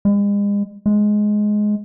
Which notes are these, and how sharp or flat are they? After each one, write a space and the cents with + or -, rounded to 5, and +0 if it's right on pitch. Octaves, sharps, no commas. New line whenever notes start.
G#3 -40
G#3 +10